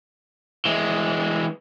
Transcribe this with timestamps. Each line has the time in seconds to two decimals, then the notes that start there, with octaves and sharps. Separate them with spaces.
0.65 E3 G#3